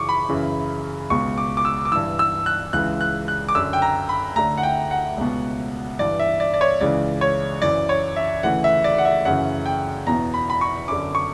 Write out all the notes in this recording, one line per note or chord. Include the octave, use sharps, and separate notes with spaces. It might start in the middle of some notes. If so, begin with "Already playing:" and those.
Already playing: F#2 C#3 E3 C#6 D6
B5
F#2 C#3 E3
C#2 B2 C#6
D6
D6
E6
D6
G2 E3 E6
E6
F#6
C#2 C#3 E3 F#6
F#6
F#6
D6
F#2 D3 E6
G5
A#5
B5
D2 D3 A#5
F#5
G5
F#5
C#2 B2
G2 E3 D5
E5
D5
D5
C#5
C#2 C#3 E3 D5
C#5
F#2 E3 D5
C#5
E5
D2 C#3 E3 F#5
E5
D5
F#5
E5
F#2 C#3 E3 F#5
G5
E2 B2 A#5
B5
B5
C#6
F#2 D3 D6
C#6